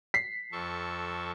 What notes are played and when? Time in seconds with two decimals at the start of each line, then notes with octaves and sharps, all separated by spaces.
0.14 B6 C7
0.52 F2 A4 C#6